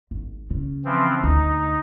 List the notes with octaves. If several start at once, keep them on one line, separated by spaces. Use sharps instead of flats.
G#1
C#3
E3 F3 C4
D2 D#4